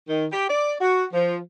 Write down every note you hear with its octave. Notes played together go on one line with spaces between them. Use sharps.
D#3
G4
D5
F#4
F3